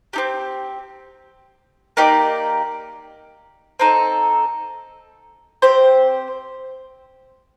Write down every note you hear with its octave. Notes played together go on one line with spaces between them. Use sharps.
C4 D#4 G4
A#3 D#4 G4 D5
C4 D#4 A4
C4 G4 C5